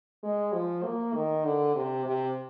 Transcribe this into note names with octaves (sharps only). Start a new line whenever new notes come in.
G#3
F3
A#3
D#3
D3
C3
C3